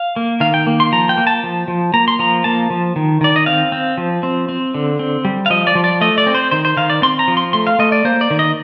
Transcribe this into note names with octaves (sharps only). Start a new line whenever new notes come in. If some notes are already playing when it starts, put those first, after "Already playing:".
Already playing: F5
A#3
D#3 F5
G5
A#3
C6
F3 A#5
G5
A#3
A5
F3
F3
A#3 A#5
C6
F3 A#5
A#3 A5
F3
D#3
D#3 D5
D#5
C4 F5
C4
F3
C4
C4
D3
C4
G3
F5
F3 D#5
D5
F3
D5
A3 D#5
D5
C4
C5
D#3 C5
C5
D#3 F5
D5
C4 C6
A#5
F3
C6
A3 C6
F5
A3 D#5
D5
A#3 C5
D5
D#3
D#5